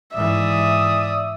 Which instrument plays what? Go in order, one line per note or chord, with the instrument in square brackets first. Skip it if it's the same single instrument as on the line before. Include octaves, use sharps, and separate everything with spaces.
[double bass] G#2 E3 [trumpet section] D5 D#6 [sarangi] E5